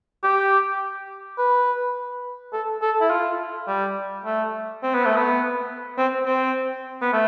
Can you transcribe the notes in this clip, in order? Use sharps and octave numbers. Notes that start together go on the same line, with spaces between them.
G4
B4
A4
A4
E4
F4
G3
A3
C4
B3
A3
B3
C4
C4
B3
A3